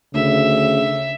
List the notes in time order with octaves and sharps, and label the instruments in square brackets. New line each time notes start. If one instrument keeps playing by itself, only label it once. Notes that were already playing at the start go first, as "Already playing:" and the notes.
[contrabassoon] D2 [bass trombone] C#3 [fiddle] E5